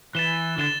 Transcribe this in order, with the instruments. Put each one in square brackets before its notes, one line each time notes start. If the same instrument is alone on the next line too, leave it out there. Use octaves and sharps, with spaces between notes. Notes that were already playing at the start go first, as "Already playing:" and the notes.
[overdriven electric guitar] E3 [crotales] A6 E7 G7
[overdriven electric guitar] D3 [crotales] A6 E7 G7